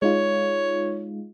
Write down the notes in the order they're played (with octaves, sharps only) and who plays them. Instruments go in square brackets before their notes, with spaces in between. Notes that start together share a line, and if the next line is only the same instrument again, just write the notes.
[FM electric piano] G#3 D#4 F4 [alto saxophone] C#5